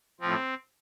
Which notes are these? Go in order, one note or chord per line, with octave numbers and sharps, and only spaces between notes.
A2 F3 C4